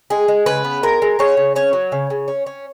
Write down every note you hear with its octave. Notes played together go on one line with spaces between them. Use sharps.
G#3 G#4
G#3
C#3 B4
B3
G#3 A#4
G#3
G#3 C#5
C#3
C#4 C#5
F#3
C#3
C#3
C#4
C#4